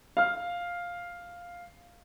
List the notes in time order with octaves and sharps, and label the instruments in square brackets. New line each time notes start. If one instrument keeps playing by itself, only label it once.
[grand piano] F5 F6